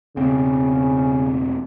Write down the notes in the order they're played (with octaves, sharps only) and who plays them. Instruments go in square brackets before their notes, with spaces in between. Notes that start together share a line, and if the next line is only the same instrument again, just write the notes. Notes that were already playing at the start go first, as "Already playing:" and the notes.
[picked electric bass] E1 C4 [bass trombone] C#3